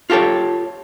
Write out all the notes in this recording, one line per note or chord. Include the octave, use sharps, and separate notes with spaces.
F4 G4 A4 C#5